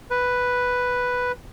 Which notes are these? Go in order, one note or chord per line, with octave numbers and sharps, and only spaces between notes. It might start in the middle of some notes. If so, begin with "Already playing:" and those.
B4